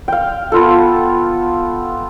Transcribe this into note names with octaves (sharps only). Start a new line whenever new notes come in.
F5 G5
B3 F4 A4